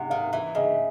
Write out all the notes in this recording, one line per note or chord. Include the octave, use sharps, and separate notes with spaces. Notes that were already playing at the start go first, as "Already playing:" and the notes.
Already playing: C3 F#5
D#3 F5
E3 E5
C#3 D#5